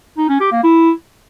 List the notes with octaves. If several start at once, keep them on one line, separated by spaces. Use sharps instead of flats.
D#4
C#4
G4
A#3
E4